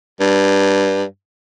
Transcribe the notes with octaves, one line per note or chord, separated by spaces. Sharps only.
G2